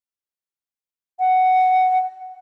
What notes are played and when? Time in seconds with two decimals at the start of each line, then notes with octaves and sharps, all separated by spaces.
1.20 F#5